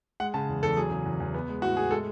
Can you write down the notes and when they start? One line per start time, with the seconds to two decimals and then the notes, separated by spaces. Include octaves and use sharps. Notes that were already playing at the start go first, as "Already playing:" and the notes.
0.20 G#3 F#5
0.34 C#3 A5
0.49 E2
0.63 E2 A4
0.77 F#3 G#4
0.91 C#3
1.06 E2
1.20 E2
1.34 B3
1.48 G#3
1.62 A2 F#4
1.76 A2 G#4
1.91 G#3 A4